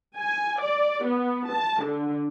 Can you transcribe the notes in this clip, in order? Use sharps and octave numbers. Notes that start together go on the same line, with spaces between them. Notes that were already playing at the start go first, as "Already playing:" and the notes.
G#5
D5
B3
A5
D3